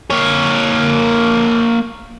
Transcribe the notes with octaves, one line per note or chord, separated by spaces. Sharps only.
A#3 C#5